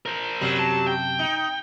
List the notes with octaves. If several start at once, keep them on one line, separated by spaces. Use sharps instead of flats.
A#4 C5
F#2 C3 F#3 G3
A5
G5
D#4